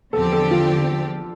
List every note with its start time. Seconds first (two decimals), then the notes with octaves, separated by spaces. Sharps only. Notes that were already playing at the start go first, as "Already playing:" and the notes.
0.13 E2 D3 F3 C4 G4 A4
0.32 A4
0.51 F4